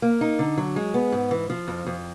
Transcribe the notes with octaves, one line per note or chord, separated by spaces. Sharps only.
A#3
D#4
D3
F#3
G#3
B3
G#2
E3
F3
F2
F2